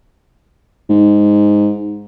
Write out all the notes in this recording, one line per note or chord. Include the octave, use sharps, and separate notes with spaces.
G#2